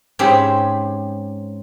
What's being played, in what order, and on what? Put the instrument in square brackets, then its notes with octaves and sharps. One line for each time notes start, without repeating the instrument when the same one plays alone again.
[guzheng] G#2 C4 C#4 G4 G#4 B5